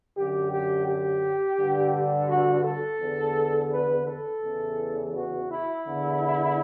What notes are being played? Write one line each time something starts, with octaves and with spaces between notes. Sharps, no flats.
F#2 D3 G4
G4
G4
G2 D3
F#4
A4
E2 D3
B4
A4
E2 C#3 E3
F#4
E4
E2 D3